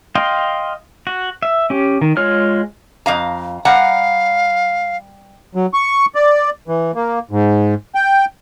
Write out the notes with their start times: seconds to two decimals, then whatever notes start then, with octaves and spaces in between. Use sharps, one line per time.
0.15 D#5 F5 G5 C6
1.07 F#4
1.43 E5
1.70 C#4 G4
2.01 D#3
2.17 G#3 F4 C#5 F6
3.06 F2 F5 A#5
3.65 G3 F5 F#5 A#5
5.55 F#3
5.74 C#6
6.15 D5
6.68 E3
6.95 A#3
7.31 G#2
7.95 G5